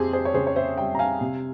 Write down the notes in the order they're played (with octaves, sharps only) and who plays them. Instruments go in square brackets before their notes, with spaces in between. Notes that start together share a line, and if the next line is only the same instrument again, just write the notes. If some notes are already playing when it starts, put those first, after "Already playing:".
Already playing: [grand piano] F2 C4 G4 G#4
G#4 C5
C#5
C#3 G#4 C5
C#5
C5 E5
G3 E5 G5
A#5
F5 G#5
C3